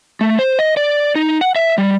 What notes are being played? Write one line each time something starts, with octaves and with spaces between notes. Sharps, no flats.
A3
C5
D#5
D5
D#4
F#5
E5
G3